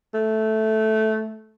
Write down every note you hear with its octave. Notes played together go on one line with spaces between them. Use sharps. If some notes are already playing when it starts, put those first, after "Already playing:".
A3